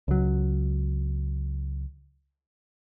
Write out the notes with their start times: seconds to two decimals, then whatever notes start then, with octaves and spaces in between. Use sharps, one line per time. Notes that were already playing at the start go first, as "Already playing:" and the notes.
0.08 C#2 F#3